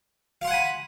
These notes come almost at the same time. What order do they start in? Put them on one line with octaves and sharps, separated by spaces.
F5 C6 F#5 G#5 B5